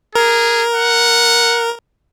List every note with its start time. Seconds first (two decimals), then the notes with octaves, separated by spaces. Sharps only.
0.15 G#4 A#4
0.74 F#5